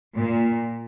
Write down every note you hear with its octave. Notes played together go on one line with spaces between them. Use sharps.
A#2